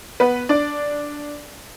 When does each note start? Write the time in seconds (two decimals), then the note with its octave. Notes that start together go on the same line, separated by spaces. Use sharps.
0.20 B3 B4
0.49 D4 D5